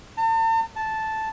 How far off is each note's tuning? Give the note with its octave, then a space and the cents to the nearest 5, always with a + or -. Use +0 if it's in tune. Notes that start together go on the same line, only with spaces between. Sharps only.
A5 +45
A5 -5